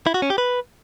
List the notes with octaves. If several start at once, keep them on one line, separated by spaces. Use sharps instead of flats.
E4
F#4
C#4
G4
B4